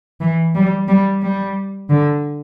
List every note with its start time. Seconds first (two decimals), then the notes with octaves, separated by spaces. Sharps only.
0.20 E3
0.55 G3
0.88 G3
1.22 G3
1.89 D3